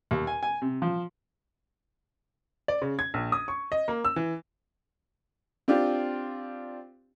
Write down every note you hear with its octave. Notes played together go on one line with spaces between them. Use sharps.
D#2
G#5
G#5
C3
F3
D5
C#3
G#6
A#1
D#6
C#6
D#5
A#3
E6
E3
C4 D4 F4 G4